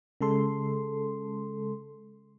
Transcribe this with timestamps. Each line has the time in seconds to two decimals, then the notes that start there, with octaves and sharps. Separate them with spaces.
0.21 C#3 G#3 A4 C6